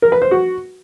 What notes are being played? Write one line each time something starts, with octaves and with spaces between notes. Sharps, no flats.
A#4
B4
C5
F#4